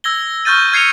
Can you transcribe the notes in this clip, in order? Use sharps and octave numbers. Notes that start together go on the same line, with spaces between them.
E6 G#6 A#6 G7
C#6 F6 G6 A6 D#7
F6 G#6 C7 C#7 D#7 F7